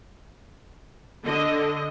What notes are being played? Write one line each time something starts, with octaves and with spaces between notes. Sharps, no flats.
D3 D#5